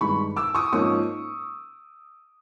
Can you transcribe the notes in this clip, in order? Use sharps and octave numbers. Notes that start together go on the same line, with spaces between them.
G2 D#3 G#3 B5 C#6
D6 E6
C#6 D#6
G#2 F3 A#3 C#4 C#6 D#6